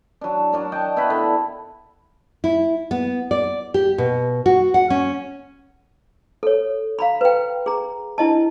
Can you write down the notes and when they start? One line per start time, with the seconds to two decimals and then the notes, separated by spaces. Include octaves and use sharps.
0.21 F#3 D4
0.53 F#3 D4 A#4
0.72 D#5 G5 A5
0.96 B3 E4 F#4 B4
1.10 D3
2.44 E4
2.91 B3
3.31 D5
3.74 G4
3.98 B2
4.46 F#4
4.74 F#5
4.90 C#4
6.43 A4 C#5
6.99 F5 A#5 B5
7.21 B4 G5
7.66 G#4 A#5
8.18 D4 E4 D#5 A5